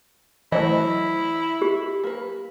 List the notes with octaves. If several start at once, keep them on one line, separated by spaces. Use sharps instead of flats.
E3 F#3 A3 E4 C5 D#5
G4
A#3 B4